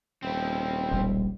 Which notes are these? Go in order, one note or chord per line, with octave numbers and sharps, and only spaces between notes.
D#1 C4 E4
E1 A#1 G3